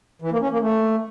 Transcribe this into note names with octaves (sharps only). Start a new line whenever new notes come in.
E3
A#3
C#4
A#3
A3